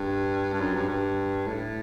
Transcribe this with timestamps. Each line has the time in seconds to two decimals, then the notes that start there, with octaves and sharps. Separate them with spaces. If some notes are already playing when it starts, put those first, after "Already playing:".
Already playing: G2
0.53 G2
0.61 F#2
0.75 G2
0.89 G2
1.47 A2